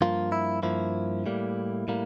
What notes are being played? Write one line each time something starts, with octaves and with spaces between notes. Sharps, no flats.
G2 F3 A#3 F4
E4
G2 F3 A#3 E4
A2 G3 A#3
A2 G3 A#3